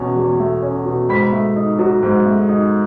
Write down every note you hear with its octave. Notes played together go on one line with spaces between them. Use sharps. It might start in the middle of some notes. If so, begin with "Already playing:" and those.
Already playing: E2 B2 C#4
E2
A3
C#4
B2
G#2 B5 B6
A3
D#4
F#3
G#2
A3
D#4